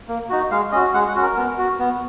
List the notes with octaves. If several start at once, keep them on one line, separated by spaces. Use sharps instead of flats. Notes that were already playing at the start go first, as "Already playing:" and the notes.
A#3
D#4 F#4
G#3 F5
C#4 F#4 D#5
G#3 F#5
F#5
C#4 F#4
A#4
B3
F#4
B3